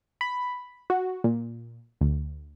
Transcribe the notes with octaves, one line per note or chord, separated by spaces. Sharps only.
B5
F#4
A#2
D2